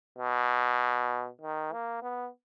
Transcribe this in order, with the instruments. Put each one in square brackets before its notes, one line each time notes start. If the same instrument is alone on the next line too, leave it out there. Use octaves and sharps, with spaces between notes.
[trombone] B2
D#3
A#3
B3